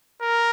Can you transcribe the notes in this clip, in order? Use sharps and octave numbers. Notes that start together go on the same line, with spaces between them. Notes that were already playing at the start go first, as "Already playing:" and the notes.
A#4